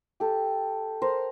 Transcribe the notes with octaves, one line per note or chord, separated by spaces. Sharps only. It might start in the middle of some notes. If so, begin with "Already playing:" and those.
G4 A4
A#4 C5